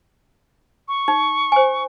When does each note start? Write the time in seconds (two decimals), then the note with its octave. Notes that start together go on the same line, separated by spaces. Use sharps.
0.88 C#6
1.08 D#4
1.52 C5 G#5